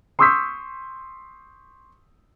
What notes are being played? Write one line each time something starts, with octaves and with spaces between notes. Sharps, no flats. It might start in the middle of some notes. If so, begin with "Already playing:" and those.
C6 C#6 D#6 E6 G6 B6